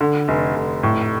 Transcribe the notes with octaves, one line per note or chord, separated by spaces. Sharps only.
D3
F1
F1
A2